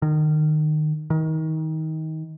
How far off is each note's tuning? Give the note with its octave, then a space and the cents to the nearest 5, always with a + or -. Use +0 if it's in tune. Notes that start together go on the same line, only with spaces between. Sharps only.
D#3 -25
D#3 +25